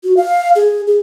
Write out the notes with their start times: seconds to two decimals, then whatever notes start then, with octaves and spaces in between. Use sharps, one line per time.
0.04 F#4
0.17 F5
0.55 G#4
0.87 G#4